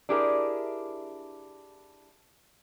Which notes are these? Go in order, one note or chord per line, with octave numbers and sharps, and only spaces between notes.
D4 E4 G4 G#4 A#4 E5